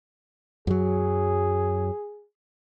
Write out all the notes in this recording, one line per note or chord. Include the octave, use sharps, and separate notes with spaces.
F#2 F#3 G#4